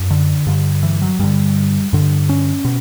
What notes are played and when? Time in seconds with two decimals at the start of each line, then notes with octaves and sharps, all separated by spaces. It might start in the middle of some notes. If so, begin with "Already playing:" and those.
Already playing: F#2
0.10 D3
0.47 G2 D3
0.83 E3
1.02 F#3
1.19 G2 D3 G3
1.93 G2 D3
2.29 C#4
2.65 B2